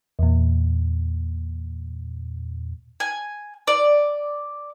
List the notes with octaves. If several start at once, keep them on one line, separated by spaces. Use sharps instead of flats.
E2 A#2
G#5
D5